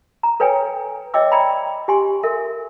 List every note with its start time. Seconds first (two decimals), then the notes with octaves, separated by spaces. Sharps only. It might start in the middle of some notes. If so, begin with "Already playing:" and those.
0.23 A#5
0.40 A4 B4 C#5 G5 G#5
1.14 C#5 D#5 E5 G5 D6 E6
1.32 D5 G5 A#5 B5
1.88 G4 G#5 C6
2.23 A4 A#4 E5